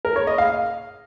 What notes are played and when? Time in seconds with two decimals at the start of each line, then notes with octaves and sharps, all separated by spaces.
0.05 A#4
0.16 C#5
0.27 D#5
0.38 F5